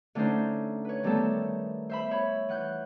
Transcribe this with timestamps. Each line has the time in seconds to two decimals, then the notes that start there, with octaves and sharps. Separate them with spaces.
0.15 D3 A3 C#4 D#4 C5
0.85 B4 C#5
1.03 D#3 G3 A3 B3 A4
1.90 C5 E5 B5
2.11 C#5 B5
2.49 E3 F#5 F#6 G6